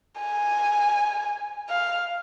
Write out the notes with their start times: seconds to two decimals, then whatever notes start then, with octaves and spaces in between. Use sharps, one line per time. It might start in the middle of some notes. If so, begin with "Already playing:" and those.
0.20 G#5
1.70 F5